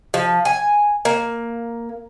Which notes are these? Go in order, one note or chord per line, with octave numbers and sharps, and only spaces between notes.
F3
G#5
A#3